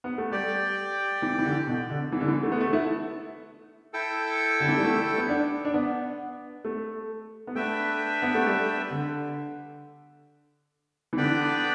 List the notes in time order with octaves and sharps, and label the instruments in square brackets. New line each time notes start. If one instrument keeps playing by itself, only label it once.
[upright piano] B3
A3
[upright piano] G3 [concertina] G4 D5 G5
[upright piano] E3
E3
D3
B2
D3
E3
D3
E3
A3
B3
A3
E4
[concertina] E4 A4 G5
[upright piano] D3
E3
G3
A3
B3
D4
D4
B3
A3
B3
[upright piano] A3 [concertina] D4 B4 E5 G5
[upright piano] B3
A3
G3
D3
E3
[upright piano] D3 [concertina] B3 D4 B4 D5 G5